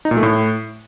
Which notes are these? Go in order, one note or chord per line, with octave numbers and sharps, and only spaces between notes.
D#4
A#2
A3
A2